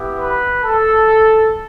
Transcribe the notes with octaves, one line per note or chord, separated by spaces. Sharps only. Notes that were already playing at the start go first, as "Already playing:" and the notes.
Already playing: B3 E4 G4
B4
A4